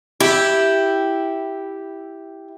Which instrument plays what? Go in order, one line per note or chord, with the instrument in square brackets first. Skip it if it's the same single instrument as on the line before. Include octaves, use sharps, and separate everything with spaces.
[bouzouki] E4 [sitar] G4